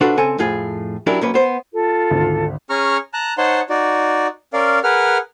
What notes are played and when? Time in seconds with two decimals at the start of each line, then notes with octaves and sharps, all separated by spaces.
0.01 C3 D4 F4 F#4 A4 B4
0.17 C#3 C4 A4 G#5
0.38 F2 A2 F4 G#4
1.07 F#3 C#4 D4 E4 G4 A#4
1.21 B1 A#3 C#4 B4
1.34 B3 C5
1.73 F4 A4
2.11 G#1 D2
2.70 C#4 G#4 A#5 C#6 F6
3.14 A5 A#5 F#6
3.38 D#4 C5 C#5 F#5 A5 C6
3.70 D#4 F#4 D5
4.53 C#4 A#4 D5 F5
4.84 G#4 A#4 B4 F#5 F6